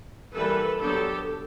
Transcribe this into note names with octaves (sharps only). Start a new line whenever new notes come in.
E3 G3 A#3 A4 B4
F#3 B3 D4 G4 A4